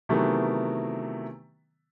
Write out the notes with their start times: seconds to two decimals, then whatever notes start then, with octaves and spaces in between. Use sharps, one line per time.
0.09 C3 D#3 E3 F#3 A3 B3